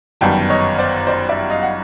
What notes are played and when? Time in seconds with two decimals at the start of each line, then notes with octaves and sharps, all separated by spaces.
0.21 G1 F#2 D#3 G3 B3 G5 A5
0.50 C#5 D#5
0.79 C5 D5
1.07 C5 D5
1.29 D5 E5
1.50 D#5 F5
1.63 F#5